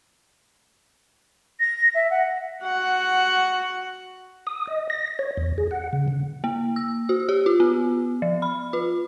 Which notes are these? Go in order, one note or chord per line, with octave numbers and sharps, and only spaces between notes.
A#6
E5
F#5
F#4 F#5
D#6
D#5
A#6
C#5
E2
G#4
F#5
C#3
C#3
A#3
E6
F#4
G4
F4
B3
F3
B5
F4